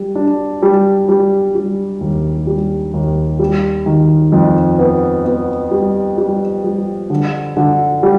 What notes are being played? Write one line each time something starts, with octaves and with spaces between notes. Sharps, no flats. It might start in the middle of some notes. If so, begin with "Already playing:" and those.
Already playing: G3
D4
G3
G3
G3
D#2
G3
D#2
G3
D#3
F2
B3
B3
G3
G3
G3
D3
D3
G3